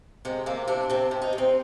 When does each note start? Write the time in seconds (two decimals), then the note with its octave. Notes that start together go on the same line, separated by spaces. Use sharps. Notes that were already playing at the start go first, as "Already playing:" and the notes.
0.25 C3 G#3
0.46 C3 A#3
0.67 C3 D4
0.89 C3 C4
1.11 C3
1.22 D#4
1.33 C3
1.38 C4